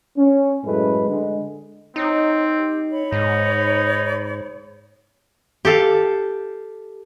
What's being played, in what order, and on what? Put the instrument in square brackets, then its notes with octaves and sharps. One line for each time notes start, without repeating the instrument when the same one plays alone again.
[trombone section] C#4
F#2 A2 G#3 A3 B4
D3 G#3
[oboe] C4 [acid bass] D#4 [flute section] C#5 A#5
[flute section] G4
C#5 B5
[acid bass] G#2 [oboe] D#4
[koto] G4 A4 F5